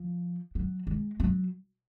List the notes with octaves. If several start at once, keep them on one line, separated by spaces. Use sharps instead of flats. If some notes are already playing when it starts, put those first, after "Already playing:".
Already playing: F3
F#3
G#3
F#3